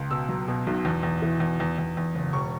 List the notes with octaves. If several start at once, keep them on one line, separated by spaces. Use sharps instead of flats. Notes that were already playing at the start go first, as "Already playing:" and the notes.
Already playing: C#2
B2 E6
F#3
B2
B1
E2
E2
E3
E2
E2
E2
E2
F#1
E1 C#6